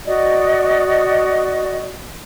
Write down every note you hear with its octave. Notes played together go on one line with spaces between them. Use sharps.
F#4 D5 D#5